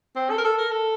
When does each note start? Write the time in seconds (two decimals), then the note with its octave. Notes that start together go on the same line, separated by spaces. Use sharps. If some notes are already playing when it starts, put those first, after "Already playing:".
0.16 C4
0.30 A4
0.38 A#4
0.44 A4
0.58 A#4
0.71 A4